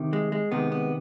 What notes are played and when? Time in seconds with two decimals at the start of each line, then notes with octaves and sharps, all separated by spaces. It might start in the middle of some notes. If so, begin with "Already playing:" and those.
Already playing: C3 D#3
0.13 G#3
0.32 G#3
0.52 C3 D#3 G#3 B3
0.72 B3